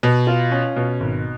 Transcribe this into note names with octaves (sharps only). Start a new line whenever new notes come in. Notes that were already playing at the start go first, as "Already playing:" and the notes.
B2
F4
C#4
B2
G#1